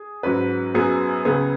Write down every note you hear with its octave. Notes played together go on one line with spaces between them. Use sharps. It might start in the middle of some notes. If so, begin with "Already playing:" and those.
Already playing: G#4
G#2 F#3 C#4 B4
F#2 F#3 B3 G#4
C#2 C#3 B3 G#4